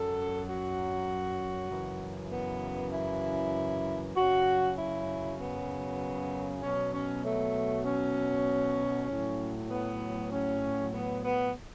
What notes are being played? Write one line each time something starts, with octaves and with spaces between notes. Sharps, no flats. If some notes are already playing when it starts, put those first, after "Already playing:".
Already playing: F#2 F#3 A4
F#4
F#2 C#3 E3
B3
E4
F#2 C#3 F#3 F#4
E4
B3
B2 F#3 C#4
C#4
A3
C#4
A2 F#3
B3
C#4
B3
B3